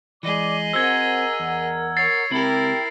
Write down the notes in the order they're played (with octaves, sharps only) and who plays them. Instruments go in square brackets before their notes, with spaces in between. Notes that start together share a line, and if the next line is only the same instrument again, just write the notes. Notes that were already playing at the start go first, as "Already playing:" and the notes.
[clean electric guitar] E3 G#3 [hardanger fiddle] G#4 D#5 [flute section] D5 D6
[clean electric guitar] C4 F#4 C5 [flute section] A#4 F#5 A#5 [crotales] E6 G#6
[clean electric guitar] E2
[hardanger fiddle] C#5 [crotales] A6 C7
[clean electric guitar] C#2 C4 B5 [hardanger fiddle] E4 A#4 [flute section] G4 G5